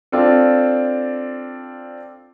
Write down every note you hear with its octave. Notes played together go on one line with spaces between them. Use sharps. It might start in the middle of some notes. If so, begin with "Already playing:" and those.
C4 D4 F4 A4